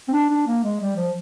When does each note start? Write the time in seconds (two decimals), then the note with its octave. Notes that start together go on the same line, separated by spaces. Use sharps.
0.08 C4
0.12 D4
0.30 D4
0.47 A#3
0.63 G#3
0.81 G3
0.96 F3